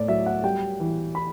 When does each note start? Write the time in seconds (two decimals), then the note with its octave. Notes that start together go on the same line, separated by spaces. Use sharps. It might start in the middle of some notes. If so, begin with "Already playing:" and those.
Already playing: A2 D5
0.08 F#3 E5
0.26 F#5
0.44 G3 G5
0.80 E3
1.15 B5